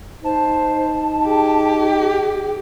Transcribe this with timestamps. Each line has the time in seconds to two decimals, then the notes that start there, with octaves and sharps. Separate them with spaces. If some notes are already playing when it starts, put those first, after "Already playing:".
0.24 D#4 C5 A5
1.26 G4 G#4